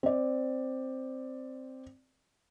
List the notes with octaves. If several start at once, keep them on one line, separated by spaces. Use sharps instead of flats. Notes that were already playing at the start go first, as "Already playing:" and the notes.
C4 D5